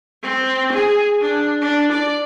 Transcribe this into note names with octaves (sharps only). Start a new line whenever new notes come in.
C4
G#4
D4
D4
D5